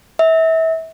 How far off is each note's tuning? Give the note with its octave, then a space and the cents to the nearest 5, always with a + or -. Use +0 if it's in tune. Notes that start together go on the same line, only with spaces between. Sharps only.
E5 -30